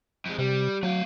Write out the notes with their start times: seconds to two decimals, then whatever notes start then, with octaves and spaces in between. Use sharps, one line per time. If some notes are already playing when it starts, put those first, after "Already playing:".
0.26 F2 G#3
0.39 C3 G3
0.83 F#3 A3 F5